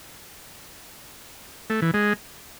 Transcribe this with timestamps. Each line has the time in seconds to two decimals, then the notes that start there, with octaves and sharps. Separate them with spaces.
1.70 A3
1.82 E3
1.94 G#3